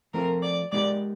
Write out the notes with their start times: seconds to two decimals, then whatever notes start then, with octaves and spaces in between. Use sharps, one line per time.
0.14 F3 A3 C4 F4 A#4
0.43 D5
0.72 G#3 B3 D#4 G4 A#4 D5